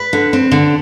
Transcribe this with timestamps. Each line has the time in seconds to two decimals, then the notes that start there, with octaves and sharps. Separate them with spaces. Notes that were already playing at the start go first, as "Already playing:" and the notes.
Already playing: B4
0.13 D3
0.33 C4
0.52 D3